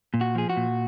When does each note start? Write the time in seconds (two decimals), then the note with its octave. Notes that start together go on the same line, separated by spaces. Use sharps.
0.14 A#2
0.21 F#4
0.35 F3 G#4
0.50 F#4
0.57 A#2